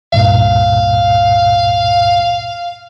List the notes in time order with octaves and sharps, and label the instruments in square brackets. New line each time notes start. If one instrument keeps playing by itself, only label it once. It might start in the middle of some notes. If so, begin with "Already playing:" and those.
[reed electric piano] C#2 G2 A#2 [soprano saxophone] F5